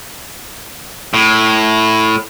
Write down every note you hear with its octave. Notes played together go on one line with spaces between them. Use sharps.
A2